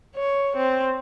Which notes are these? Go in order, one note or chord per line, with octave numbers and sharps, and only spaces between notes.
C#5
C4